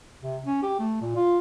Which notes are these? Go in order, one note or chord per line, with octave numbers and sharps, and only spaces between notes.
C3
C#4
G4
A3
A#2
F4